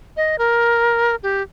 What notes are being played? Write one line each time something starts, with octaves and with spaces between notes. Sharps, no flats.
D#5
A#4
G4